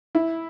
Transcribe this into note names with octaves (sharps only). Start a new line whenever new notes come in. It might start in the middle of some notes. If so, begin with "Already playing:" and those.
E4